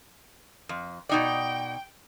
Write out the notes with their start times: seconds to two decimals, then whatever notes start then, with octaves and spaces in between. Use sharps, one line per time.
0.69 F2
1.09 B2 D#4 D5 G5